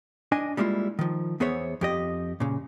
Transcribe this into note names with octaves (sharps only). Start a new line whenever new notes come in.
D4 D#5 G#5
G3 G#3 A#3 E4 F4
D#3 F3
E2 B3 G#4 C5 C#5 E5
F2 G4 D#5
A#2 C#3